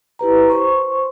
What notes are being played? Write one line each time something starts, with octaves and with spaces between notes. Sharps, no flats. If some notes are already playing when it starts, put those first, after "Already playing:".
E4 G4 B4 A#5
C5 C6 C#6